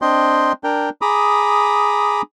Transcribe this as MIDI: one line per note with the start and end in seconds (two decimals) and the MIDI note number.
0.02 0.52 60
0.02 0.52 62
0.02 0.52 75
0.02 0.52 79
0.02 0.52 84
0.64 0.89 62
0.64 0.89 70
0.64 0.89 79
1.01 2.22 68
1.01 2.22 82
1.01 2.22 83
1.01 2.22 86
1.01 2.22 87